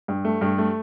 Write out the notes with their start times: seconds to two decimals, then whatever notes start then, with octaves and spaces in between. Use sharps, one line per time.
0.08 G2
0.25 A3
0.41 G2
0.58 A3